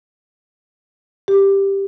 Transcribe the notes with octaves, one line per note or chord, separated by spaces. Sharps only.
G4